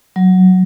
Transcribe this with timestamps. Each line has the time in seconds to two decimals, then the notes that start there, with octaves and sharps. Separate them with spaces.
0.16 F#3